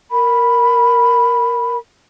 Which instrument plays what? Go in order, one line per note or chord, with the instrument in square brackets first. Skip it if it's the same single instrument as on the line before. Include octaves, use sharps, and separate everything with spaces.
[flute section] A#4 B5